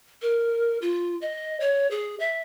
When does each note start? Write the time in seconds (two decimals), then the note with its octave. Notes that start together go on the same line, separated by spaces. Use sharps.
0.22 A#4
0.82 F4
1.22 D#5
1.60 C#5
1.91 G#4
2.20 E5